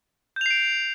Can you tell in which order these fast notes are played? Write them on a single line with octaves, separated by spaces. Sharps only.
G6 F7 C7 D7